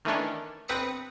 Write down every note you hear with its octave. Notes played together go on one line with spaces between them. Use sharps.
D#3 E3 A3 C#4 D4
G1 C4 B4 D#6 A#6 C#7